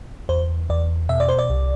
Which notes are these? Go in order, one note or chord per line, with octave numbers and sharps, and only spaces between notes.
E2 C5
E2 D5
B2 E5
D5
C5
D5
C2